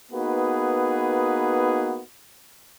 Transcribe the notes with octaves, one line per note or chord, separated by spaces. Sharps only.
A#3 B3 D#4 F#4 G#4 B4